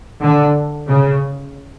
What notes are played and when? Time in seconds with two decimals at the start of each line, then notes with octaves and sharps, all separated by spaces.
0.21 D3
0.87 C#3